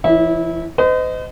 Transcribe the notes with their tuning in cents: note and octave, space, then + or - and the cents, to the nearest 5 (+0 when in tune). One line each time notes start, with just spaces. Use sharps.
E3 +35 E4 -25 C#5 +0
C5 -45 D#5 +0